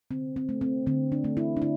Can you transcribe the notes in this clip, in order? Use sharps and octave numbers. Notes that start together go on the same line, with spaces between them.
D3 C4
C4
A3
C4
D3 C4
D4
A3
E4
D4
D3 E4